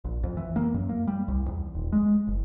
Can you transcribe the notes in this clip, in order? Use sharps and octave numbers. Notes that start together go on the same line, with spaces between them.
A#1
F2
E3
A#3
F#2
A#3
G3
C2
E2
D#1
G#3
F#1